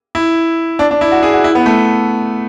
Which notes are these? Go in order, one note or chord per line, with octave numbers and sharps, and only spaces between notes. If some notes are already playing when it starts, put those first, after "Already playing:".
E4
D4
D4
E4
F#4
G#4
F#4
E4
B3
A3